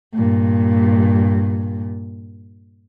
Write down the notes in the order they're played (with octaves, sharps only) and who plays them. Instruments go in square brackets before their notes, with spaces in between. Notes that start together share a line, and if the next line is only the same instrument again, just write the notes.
[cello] G2 A#2